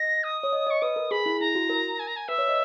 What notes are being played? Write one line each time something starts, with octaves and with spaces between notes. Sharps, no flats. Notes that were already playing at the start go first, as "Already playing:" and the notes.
Already playing: D#5 A#6
D#6
C#5
D#5
D#5 C#6
B4 D#6
A#4
G#4 B5
E4
E4 A#5
F#4
A#4
G#5
A#5
G#5
B4 E5
C#5
D#5